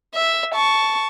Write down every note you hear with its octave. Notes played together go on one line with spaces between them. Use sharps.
E5
A5 C#6